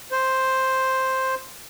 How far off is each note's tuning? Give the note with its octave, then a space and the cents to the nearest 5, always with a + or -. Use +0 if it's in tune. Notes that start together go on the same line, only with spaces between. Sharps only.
C5 +5